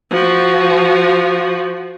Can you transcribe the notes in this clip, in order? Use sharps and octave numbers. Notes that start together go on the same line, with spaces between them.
F3 F#4